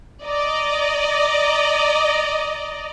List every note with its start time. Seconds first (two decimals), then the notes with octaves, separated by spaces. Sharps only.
0.23 D5 D#5 A#5